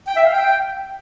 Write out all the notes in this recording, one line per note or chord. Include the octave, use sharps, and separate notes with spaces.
G5
E5
F5
G5